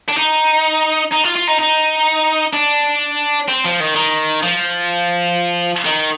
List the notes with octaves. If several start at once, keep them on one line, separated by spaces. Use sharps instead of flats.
D4
D#4
D#4
F4
F4
D#4
D#4
D4
C4
F3
D#3
D#3
F3
D#3